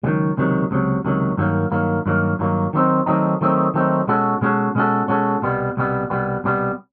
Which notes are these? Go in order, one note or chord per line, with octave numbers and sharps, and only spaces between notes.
C#2 C3 D#3 F#3
C#2 C3 D#3 F#3
C#2 C3 D#3 F#3
C#2 C3 D#3 F#3
G2 D#3 F#3 A#3
G2 D#3 F#3 A#3
G2 D#3 F#3 A#3
G2 D#3 F#3 A#3
D#3 F#3 A3 C4 D#4
D#3 F#3 A3 C4 D#4
D#3 F#3 A3 C4 D#4
D#3 F#3 A3 C4 D#4
B2 G#3 C#4 F#4 A4
B2 G#3 C#4 F#4 A4
B2 G#3 C#4 F#4 A4
B2 G#3 C#4 F#4 A4
C2 B2 G3 B3
C2 B2 G3 B3
C2 B2 G3 B3
C2 B2 G3 B3